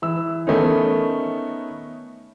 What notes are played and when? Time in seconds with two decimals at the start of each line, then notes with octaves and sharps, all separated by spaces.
0.02 E3 E6
0.47 D#3 A3 B3 C#4 D#4